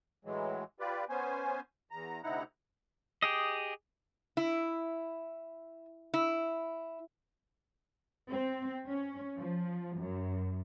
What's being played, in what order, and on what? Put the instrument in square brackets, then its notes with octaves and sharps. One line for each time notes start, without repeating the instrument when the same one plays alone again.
[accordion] A2 E3 F#3 G#3
F4 G4 B4 D5
B3 C#4 C5 G#5
E2 A#5
D2 C3 D#4 E4 F#5 A#5
[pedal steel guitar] G4 G#4 D#5
[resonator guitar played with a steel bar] E4
E4
[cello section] C4
C#4
F3
F#2